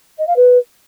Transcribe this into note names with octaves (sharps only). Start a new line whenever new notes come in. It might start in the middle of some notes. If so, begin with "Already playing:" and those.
D#5
F5
B4